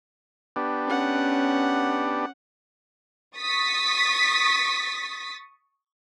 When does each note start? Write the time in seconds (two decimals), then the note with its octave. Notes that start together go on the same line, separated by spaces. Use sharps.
0.56 B3 D4 G4
0.87 C#4 F#5
3.36 C#6 D#6 A6 B6